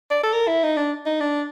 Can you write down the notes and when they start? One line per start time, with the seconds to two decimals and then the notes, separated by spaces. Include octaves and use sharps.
0.11 D5
0.24 A4
0.33 A#4
0.48 E4
0.63 D#4
0.77 D4
1.06 D#4
1.21 D4